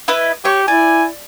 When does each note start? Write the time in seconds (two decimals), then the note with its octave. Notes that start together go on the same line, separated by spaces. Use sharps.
0.08 E4 B4 D#5
0.45 G4 C#5 C#6
0.68 E4 D5 G#5